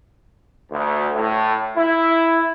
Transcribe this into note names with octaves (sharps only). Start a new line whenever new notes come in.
D2
A2
E4